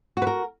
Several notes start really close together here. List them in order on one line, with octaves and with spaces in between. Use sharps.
F#4 B4 A#4